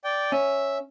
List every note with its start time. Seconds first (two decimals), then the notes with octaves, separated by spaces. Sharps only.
0.04 D5 G5
0.32 C#4 E5